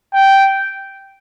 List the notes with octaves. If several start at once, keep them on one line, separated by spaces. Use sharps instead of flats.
G5